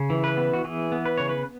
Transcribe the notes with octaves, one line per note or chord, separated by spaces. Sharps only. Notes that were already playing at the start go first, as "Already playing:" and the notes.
Already playing: C#3
E3
B4
B3
F#4
E3 G#4
B3
B4
C#3 C#5
B4